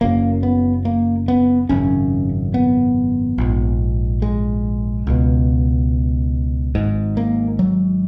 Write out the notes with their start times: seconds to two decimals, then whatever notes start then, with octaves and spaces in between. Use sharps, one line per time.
0.01 F#1 F#2 C#3 A#3
0.43 B3
0.85 A#3
1.28 B3
1.69 G#1 F#2 C#3 C#4
2.54 B3
3.38 A#1 G#2
4.22 G#3
5.07 C#2 B2
6.75 G#1 G#2
7.17 A#3
7.59 F#3